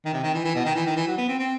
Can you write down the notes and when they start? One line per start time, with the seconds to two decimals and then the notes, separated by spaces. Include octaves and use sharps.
0.05 D#3
0.13 C3
0.23 D#3
0.34 E3
0.44 E3
0.55 B2
0.65 D#3
0.75 E3
0.86 D#3
0.96 E3
1.07 F#3
1.17 B3
1.28 C4
1.39 C4